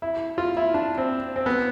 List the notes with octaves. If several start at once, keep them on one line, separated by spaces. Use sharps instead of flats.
E4
F4
E4
D4
C4
C4
B3